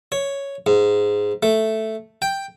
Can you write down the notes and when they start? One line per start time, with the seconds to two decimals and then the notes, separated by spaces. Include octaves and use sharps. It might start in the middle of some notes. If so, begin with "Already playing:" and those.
0.12 C#5
0.66 G#2
1.43 A3
2.22 G5